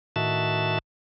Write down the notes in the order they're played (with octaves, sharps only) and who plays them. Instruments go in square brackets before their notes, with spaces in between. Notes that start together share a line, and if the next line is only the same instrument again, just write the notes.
[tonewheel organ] A2 D#3 F#4 E5 A5